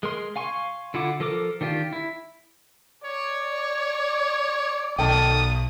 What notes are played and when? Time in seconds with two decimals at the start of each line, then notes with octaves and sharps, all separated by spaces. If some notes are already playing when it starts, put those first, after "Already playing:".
0.03 G#3 A#4 C6
0.36 F5 G#5 C6 C#6
0.94 D3 E4 F4 F#5 D6
1.20 F3 A4 A#4 D6
1.61 D#3 D4 F4 G4
1.93 E4
3.05 C#5 D5
4.98 B1 D#3 A4 G5 D#6